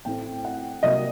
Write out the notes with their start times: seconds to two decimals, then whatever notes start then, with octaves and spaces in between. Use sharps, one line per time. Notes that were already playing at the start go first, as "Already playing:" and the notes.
0.05 A1 A2 A3 C4 G5
0.45 F#5
0.83 C2 C3 F#3 A#3 D#5